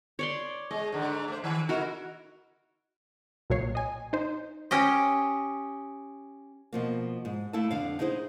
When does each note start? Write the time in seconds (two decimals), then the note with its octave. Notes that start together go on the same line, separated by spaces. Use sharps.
0.19 C#5 D5 C6
0.71 G#3 D#5
0.92 G#2 D3
1.28 A3 C5
1.44 D#3
1.69 D#4 E4 F#4 A#4
3.50 B1 A#2 F#3 C#5 C7
3.75 D#5 G#5
4.13 D#4 C5
4.71 C#4 G4 D#5
6.73 B2 F3 A#3
7.25 G#2
7.53 A3 E4 A4 F5 A5
7.71 F2 D3 F5
7.99 D#4 E4 G#4 A#4 C5